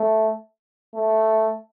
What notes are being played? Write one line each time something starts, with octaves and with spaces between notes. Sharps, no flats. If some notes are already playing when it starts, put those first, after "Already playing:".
Already playing: A3
A3